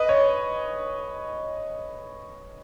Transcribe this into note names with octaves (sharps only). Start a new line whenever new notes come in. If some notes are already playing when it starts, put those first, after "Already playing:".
Already playing: B4 D#5
C#5